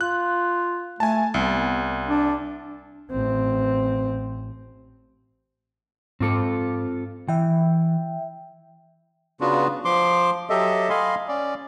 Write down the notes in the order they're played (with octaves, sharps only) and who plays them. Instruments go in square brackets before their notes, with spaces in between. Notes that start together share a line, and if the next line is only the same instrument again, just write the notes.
[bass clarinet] F4 [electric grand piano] F#6
[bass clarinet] A3 [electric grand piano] G#5 A5
[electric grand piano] C2 [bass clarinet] B3
[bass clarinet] D4
[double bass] A1 C4
[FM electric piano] G#2 D6 [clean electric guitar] C4 F4 A4
[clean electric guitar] E3 [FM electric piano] E5 G5
[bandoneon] C#3 B3 D4 F4 F#4
F3 C6 D6
F#3 G4 A4 D#5 E5
D#5 F5 G#5 B5 C6
C#4 D5